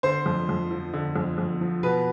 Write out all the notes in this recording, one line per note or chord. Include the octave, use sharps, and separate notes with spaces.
D3 C5
F2
F2
F3
D3
F2
F2
F3
B2 B4